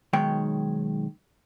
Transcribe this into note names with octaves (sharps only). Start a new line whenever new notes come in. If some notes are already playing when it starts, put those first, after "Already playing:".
B1 D#3 G#3 C#5 G5